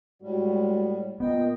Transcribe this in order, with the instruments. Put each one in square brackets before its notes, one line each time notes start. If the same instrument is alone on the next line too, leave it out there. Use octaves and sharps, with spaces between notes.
[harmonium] A2 G3 [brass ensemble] G#3 F#4
[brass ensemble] A#2 [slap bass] B3 [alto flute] D#5 [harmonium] G5